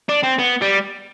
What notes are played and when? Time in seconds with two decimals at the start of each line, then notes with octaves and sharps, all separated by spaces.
0.09 D4
0.23 C4
0.38 B3
0.62 G3